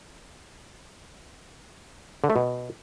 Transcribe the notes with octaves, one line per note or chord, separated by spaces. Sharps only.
D3
A3
B2